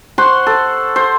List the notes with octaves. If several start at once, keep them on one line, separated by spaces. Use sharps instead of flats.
C5 F#5 C6 C#6
A4
C5